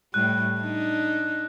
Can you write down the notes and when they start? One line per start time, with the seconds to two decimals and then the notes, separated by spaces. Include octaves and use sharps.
0.14 A2 G3 F#6
0.58 D4 D#4